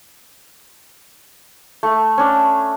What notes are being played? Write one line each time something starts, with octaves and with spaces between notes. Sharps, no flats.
A3
C#4 D4